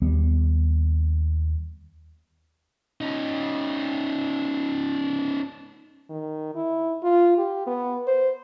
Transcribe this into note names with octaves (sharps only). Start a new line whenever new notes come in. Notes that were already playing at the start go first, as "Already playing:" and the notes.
D#2 G3 B3
C#4 D#4
D#3
E4
F4
G4
B3
C5